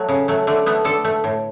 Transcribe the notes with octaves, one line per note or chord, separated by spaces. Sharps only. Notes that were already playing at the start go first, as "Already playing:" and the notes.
Already playing: F#3 A3
C#3
F#3 A3
D3 A3
A3 B3
D3 A4
A3
A2